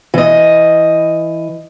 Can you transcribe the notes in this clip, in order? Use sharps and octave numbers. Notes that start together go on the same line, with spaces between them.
E3 D#5